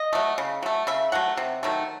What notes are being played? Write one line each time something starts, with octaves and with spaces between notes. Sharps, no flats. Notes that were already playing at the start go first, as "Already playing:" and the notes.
Already playing: D#5
F#3 A3
C#3
F#3 A3
C#3 E5
F#3 A3 F#5
C3
D#3 F#3 A3